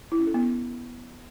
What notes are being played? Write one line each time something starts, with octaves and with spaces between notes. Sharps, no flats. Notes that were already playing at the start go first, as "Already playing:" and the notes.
E4
C#4
A4
B3